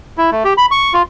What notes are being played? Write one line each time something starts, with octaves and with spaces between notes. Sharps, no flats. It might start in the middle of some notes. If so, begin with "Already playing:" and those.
E4
A3
G4
B5
C#6
F4